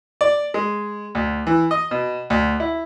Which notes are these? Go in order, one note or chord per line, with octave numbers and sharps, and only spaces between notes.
D5
G#3
D2
E3
D#5
B2
D2
E4